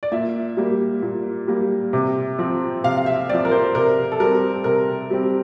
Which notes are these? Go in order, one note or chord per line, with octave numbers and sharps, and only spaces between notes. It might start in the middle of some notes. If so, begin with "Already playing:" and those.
D5
A#2 E5
G3 A#3
A#2
G3 A#3
C3
F3 C4
C3 F5
F5
E5
C4 D5
F3
A#4
C5
C3 A#4
A4
G3 C4 A#4
C3 A#4
G3 C4